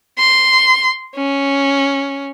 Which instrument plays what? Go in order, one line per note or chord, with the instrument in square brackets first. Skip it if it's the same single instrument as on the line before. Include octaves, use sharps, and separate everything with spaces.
[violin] C6
C#4